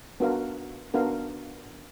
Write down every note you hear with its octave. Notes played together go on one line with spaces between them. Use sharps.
B3 D4 F#4 A#4 F5
B3 D4 F#4 A#4 F5